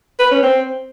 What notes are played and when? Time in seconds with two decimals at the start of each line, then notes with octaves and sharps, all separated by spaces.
0.19 B4
0.31 C#4
0.43 C4